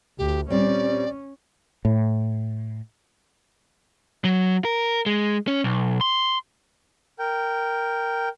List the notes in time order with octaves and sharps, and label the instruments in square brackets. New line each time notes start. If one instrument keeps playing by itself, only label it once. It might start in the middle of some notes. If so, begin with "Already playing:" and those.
[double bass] D2 [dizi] G4
[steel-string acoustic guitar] A#2 G3 C4 [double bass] C#4 [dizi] D5
[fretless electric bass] A2
[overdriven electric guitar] F#3
A#4
G#3
C#4
B1
C6
[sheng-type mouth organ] A#4 G5